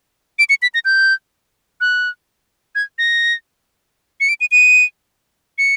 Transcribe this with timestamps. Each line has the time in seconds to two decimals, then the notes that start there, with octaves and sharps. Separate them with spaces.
0.39 D7
0.49 C#7
0.62 B6
0.74 A#6
0.85 G6
1.81 F#6
2.75 G#6
2.98 A#6
4.20 C#7
4.29 D7
4.41 D#7
4.51 D#7
5.58 C#7